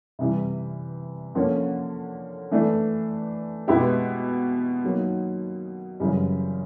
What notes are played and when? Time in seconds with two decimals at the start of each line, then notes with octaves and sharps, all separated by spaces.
0.19 C3 E3 G3
1.35 D3 F3 A#3 C#4
2.52 E3 A3 D4
3.68 B2 G#3 B3 E4 G4
4.83 D#3 F#3 A#3
6.00 F#2 C#3 E3 G3